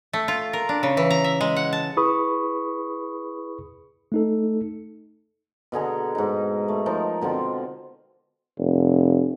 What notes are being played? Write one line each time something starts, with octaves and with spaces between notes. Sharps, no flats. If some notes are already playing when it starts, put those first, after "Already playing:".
A3
F4
A#4
D4
C#3
E3
A#5
E5
G#3
F#5
A5
E4 G#4 B4 B5 C#6 D#6
A3 D#4 A4
B2 D3 G#4 A#5
G#2 D#4
A3
F3 D#4 A#4 D5
B2 D3 C4 F4
F1